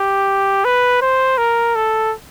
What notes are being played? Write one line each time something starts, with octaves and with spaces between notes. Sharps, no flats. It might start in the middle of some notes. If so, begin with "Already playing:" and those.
Already playing: G4
B4
C5
A#4
A4